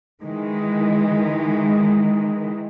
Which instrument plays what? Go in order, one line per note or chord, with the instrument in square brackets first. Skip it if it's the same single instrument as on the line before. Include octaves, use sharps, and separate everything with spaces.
[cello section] D#3 E3 G#3